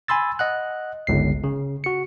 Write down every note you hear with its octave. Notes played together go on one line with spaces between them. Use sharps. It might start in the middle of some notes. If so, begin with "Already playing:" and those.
G#5 B5 C6 E6 A6
D#5 F#5 F#6
G1 C#2 C7
C#3
F#4 C#7